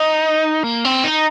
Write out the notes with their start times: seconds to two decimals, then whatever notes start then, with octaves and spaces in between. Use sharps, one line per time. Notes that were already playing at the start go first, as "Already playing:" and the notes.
Already playing: D#4
0.64 A#3
0.84 C4
1.04 D#4